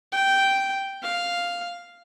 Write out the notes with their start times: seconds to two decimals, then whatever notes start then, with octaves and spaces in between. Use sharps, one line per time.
0.12 G5
1.03 F5